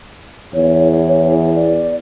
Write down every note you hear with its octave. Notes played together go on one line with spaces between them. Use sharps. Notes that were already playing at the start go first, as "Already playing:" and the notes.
E2 C#5
D5